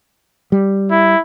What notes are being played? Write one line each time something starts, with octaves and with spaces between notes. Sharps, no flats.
G3
E4